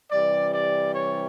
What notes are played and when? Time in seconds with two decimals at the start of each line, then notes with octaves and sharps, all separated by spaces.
0.10 C3 E3 G3 D5
0.52 D5
0.93 C#5